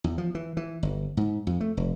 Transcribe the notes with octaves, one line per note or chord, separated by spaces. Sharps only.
E2
F3
E3
E3
G1
G#2
F2
A3
F1